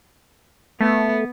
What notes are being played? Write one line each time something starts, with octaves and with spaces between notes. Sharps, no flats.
A3 B3